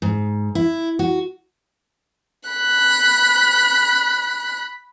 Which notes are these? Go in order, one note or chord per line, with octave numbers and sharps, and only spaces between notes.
G#2
E4
F#4
B5 F#6